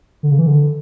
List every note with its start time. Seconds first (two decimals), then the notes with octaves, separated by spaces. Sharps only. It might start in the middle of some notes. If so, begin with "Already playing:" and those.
0.23 D3
0.31 C#3
0.39 E3
0.47 D3